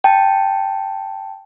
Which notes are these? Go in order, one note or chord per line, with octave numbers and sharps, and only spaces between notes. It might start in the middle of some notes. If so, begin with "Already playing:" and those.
G5 A5